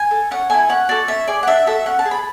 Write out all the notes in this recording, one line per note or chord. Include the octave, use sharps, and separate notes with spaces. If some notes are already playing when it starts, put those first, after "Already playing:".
Already playing: G#5
A4
C#4 F#5
E4 A4 G#5
C#4 F#5
F#4 A4 D5
C#4 E5
G#4 D5
F#5
D4 E5
F#4 A4 E5
C#4 F#5
A5
G#4
B5